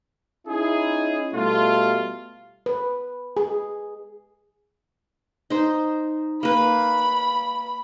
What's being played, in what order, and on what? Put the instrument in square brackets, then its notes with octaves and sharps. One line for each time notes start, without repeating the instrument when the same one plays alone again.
[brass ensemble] C#4 D#4 E4 G#4
B2 G3 A3 F4
[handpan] B4
G#4
[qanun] D#4 C5
[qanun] A#3 B4 [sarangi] B5